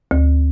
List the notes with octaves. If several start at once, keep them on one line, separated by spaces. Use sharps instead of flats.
D2